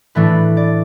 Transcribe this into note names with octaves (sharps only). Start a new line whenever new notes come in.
A2 E3 A3 D4 B4
D5